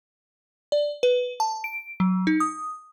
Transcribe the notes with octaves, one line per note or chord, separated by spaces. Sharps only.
D5
B4
A5
D7
F#3
D#4
D#6